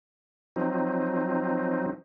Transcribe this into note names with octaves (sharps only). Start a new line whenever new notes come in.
F3 F#3 C4 D#4